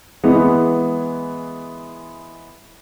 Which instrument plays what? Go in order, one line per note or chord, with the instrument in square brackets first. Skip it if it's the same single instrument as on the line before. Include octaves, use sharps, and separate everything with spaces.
[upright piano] E3 G#3 B3